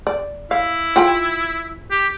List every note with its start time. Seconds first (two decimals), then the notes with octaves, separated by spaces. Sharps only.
0.07 D5
0.51 E4 F5
0.96 F4 G5 B5
1.91 G4